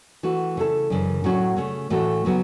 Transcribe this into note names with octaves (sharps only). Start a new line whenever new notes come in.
E3 A3 F#4
C#3 A3 E4 A4
F#2 C#3 E3
A2 F#3 A3 C#4 F#4
C#3 A3 C#4
A2 E3 A3 F#4 A4
C#3 F#3 B3